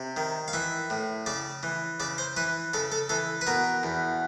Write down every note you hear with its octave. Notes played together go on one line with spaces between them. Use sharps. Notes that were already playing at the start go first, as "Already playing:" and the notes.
Already playing: C3
D#3
F5
E3 E5
A2
C#3 D5
E3
C#3 D5
C5
E3 B4
C#3 A4
A4
E3 A4
B4
B2 A#4
E2